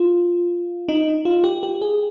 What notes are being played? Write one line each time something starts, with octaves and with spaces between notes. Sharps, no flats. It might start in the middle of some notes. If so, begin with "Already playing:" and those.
Already playing: F4
D#4
F4
G4
G4
G#4